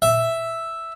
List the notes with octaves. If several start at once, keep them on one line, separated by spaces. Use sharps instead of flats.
E5